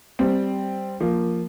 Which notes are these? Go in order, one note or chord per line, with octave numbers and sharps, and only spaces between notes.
G3 C4
F3 A#3